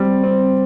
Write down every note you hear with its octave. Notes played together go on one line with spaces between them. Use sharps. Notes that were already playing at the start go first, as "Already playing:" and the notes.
Already playing: G3 C4
C4